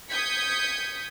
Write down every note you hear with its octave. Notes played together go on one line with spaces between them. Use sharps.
D#6 G6 G#6 B6 C#7